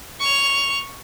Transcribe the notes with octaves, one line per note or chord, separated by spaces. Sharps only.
C#6 F7